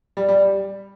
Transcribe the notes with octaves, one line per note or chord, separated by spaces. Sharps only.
G3
G3